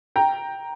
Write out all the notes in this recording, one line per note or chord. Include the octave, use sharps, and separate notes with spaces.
G5 A#5